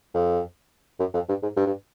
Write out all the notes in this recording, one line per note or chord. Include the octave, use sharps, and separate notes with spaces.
F2
F#2
F2
G2
G#2
G2
G2